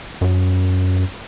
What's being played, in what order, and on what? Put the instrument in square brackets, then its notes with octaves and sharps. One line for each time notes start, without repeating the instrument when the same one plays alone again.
[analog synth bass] F#2